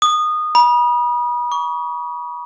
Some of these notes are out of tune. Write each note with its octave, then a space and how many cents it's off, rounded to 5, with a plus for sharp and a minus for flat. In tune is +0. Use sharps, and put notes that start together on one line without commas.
D#6 -20
B5 -40
C#6 +35